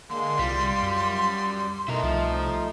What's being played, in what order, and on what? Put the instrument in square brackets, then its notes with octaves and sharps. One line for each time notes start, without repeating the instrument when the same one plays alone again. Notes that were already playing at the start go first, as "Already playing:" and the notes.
[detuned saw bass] D3 [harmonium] G#3 A#3 [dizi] C6
[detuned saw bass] C2 [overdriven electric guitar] G3 [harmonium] F4
[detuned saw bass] F#2
[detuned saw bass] B2 [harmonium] A3 D#4 [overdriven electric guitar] E4 A#4
[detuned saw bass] C2 [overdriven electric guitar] F3